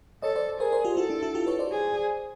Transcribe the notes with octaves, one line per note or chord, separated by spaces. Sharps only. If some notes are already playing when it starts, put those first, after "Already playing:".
A4 C#5 D#5
C5 D5
G#4 A#4 C5
A#4 C5
F4 G4
E4 F#4 A4
D4 E4
E4 F#4
F4 G4
B4 C#5
C5 D5
G#4